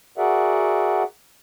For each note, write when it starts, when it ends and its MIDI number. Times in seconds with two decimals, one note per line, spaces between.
0.18 1.03 66
0.18 1.03 68
0.18 1.03 70
0.18 1.03 74
0.18 1.03 76
0.18 1.03 78